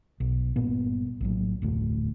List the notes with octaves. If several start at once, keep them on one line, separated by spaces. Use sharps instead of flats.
B1
G1 A#2 B3
A#1 A2 F#3
F1 D2 A2